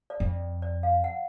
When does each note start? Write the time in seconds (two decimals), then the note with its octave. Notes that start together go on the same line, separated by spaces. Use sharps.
0.10 D5
0.20 F2
0.62 D5
0.83 F5
1.04 F#5